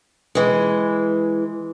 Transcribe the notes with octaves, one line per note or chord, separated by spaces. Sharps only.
E3 G#3